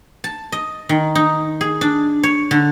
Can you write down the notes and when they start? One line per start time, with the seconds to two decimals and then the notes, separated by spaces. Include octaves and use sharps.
0.24 A5
0.52 D#5
0.89 D#3
1.15 D#4
1.61 G#4
1.81 D4
2.23 C#5
2.51 D3